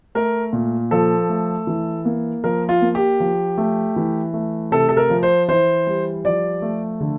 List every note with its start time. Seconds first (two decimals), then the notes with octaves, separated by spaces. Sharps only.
0.15 A3 A#4
0.53 A#2
0.91 F3 A4
1.29 A3
1.67 E3
2.05 A#3
2.44 F3 A#4
2.69 F4
2.82 A#3
2.95 G4
3.20 F3
3.58 A3
3.96 E3
4.33 A3
4.71 C3 A4
4.89 A4
4.97 A#4
5.10 F3
5.23 C5
5.48 E3 C5
5.87 G3
6.24 F3 D5
6.62 A3
7.00 D3